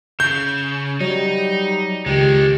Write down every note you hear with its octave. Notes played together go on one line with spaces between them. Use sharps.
C#3 G6
F#3 G3 D#4
C#2 D#3 G#3 G4